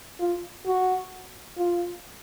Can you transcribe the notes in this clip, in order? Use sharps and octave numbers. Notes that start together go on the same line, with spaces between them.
F4
F#4
F4